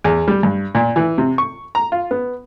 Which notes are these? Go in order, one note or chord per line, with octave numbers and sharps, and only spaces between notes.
E2
G3
G2
A#2
E3
C3
C#6
A#5
F4
B3